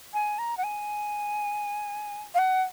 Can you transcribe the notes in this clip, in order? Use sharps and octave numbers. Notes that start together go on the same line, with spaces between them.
G#5
A#5
F#5
G#5
F5
F#5